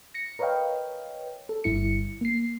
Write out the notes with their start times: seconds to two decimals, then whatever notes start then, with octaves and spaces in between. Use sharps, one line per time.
0.14 A#6 C#7
0.39 A#4 B4 C#5 D#5 F5 G5
1.49 A4
1.64 G1 G2 E4 C#7
2.21 A#3 C7